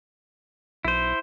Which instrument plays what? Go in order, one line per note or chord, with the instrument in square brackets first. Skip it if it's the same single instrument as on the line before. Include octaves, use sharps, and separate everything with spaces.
[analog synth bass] B1 [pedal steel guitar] E4 C5